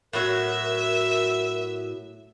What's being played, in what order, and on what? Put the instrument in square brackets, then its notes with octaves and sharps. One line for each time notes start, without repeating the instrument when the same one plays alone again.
[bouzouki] A2 F#3 F#4 [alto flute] A#4 [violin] E5